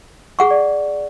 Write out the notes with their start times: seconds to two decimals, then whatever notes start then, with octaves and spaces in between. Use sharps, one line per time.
0.39 G#4 F#5 C#6
0.51 D5